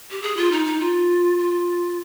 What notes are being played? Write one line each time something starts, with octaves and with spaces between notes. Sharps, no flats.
G4
G#4
F4
D#4
D#4
F4
F4